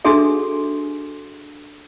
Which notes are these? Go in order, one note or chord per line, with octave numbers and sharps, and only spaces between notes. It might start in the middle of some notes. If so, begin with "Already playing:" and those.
D4 F#4 G#4 A4 E5